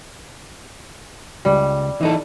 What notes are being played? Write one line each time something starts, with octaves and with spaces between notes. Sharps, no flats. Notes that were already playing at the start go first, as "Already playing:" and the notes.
C#2 G3
E3 D#4 A4